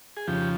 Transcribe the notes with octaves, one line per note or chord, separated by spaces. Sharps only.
G#4
F2 C#3 F3 G4